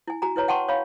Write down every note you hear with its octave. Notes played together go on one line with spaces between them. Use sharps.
E4 G#5
F#4 G#5 A#5
E4 B4 C#5 A#5
F#5 G5 A5 C6 C#6
C#5 F5 B5